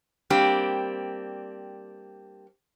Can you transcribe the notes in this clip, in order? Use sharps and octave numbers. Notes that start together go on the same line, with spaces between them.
G3 A#3 C4 D4 G4